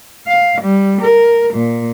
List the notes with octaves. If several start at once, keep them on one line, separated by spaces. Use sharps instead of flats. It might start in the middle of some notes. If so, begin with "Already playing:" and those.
F5
G3
A#4
A#2